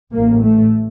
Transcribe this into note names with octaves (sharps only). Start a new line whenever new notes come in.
A1 A2 A#3
A3